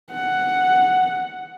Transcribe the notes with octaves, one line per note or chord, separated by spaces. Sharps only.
F#5